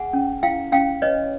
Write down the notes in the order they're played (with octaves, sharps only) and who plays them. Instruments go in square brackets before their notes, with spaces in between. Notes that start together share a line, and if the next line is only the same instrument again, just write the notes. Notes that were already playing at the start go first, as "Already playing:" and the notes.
Already playing: [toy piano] G#4 F#5 G#5
C#4
E4 F5 G5
C#4 F5 G5
B4 C#5 D#5